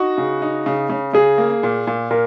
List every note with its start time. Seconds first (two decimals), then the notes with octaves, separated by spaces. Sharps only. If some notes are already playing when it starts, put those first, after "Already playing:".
Already playing: D#4 F#4
0.18 C#3
0.42 D#4
0.66 C#3
0.90 C#3
1.14 C#3 G#4
1.38 A#3
1.63 A#2
1.87 A#2
2.11 A#2 A#4